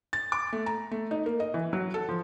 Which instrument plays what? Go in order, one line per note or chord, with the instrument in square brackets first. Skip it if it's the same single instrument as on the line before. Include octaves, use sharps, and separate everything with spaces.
[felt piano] A6
D6
A3
A#5
A3
D#4
A#3
D#5
E3
F#3
A4
F3